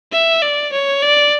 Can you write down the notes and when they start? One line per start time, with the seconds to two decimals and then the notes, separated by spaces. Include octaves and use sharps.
0.12 E5
0.42 D5
0.72 C#5
1.03 D5